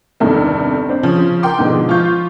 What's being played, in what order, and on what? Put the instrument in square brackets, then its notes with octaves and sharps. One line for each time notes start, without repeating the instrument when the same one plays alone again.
[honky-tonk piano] E2 G2 C3 D#3 A3
C4 D4
C#3 F3 C#4
A#4 G5 C6 D6
G#2 B2 D3 F3 G#3
F3 F4 F5 C#6 G6